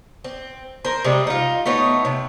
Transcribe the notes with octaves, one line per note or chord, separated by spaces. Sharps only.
C4
A#4 C5
C3 G3 G#3 C4
D#4 F4
A3 B3 D#4 C#5
C3